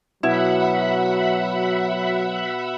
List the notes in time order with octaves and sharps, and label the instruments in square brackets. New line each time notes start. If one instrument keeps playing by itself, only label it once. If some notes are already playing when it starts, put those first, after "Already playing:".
[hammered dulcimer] B2 [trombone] F#3 [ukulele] E4 [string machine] E5 F#5 B5